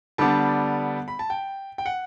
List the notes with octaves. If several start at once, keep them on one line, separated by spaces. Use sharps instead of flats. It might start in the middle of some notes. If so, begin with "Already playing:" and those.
D3 G3 B3 D4 A5
B5
A5
G5
G5
F#5